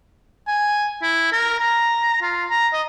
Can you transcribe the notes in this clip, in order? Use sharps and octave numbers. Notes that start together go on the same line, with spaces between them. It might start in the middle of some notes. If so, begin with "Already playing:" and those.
G#5
E4
A#4
A#5
F4
A#5
D#5